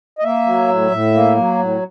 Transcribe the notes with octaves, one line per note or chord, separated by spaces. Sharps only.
D#5
A#3 E5
F#3
A2
A2
A#3
F#3
A2